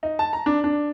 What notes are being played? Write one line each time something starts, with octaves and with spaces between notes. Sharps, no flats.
D#4
A5
A#5
D4
D4